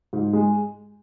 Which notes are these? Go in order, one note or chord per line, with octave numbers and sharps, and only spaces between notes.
G#2
G#3